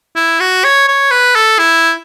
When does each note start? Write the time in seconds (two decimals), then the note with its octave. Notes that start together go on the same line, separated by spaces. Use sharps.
0.16 E4
0.40 F#4
0.64 C#5
0.88 C#5
1.11 B4
1.35 A4
1.59 E4